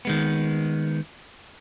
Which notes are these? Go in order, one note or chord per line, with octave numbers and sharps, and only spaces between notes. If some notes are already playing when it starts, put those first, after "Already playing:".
D#3 G#3 B3